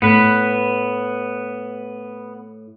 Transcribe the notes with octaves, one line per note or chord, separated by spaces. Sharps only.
A2 B3 B4